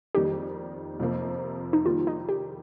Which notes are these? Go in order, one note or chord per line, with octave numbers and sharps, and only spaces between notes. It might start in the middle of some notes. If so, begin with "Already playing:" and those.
F2 D#3 G3 A#3 D#4 G4
F2 C3 F3 A#3
D#4
D#3 G3 A#3 F4
D#4
G4